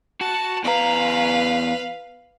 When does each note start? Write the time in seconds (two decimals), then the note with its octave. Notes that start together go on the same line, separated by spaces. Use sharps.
0.21 F#4 A5
0.64 E2 B4 F5 A#5